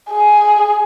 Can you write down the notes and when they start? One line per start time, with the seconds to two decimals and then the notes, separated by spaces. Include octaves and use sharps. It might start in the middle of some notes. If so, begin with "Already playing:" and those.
0.11 G#4